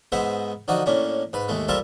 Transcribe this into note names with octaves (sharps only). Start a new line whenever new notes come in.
G#2 G#3 B3 C5 E5 F#5
D3 F3 D#4 F#4
A2 A#3 C#4 D4
G#2 B4
D#2 G#3 A3
G3 F4 A4 A#4 C5 E5